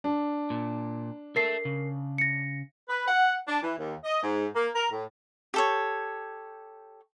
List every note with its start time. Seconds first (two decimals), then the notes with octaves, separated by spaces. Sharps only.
0.04 D4
0.50 A#2
1.36 A4 A#4 E5 A5 C7
1.65 C#3
2.18 A#6 C#7
2.89 B4
3.07 F#5
3.48 D4
3.63 E3
3.78 D#2
4.04 D#5
4.23 G#2
4.55 A#3
4.76 A#4
4.91 A2
5.54 G4 A4 C#5